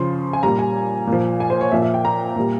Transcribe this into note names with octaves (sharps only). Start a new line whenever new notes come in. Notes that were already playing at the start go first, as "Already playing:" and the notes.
Already playing: C#3 F3 C6
G#5
A#2 G3 A#5
G#5
A#2
F3
G#5
C5
C#5
A#2 F3 E5
E5
G5
A#5
A#2 G3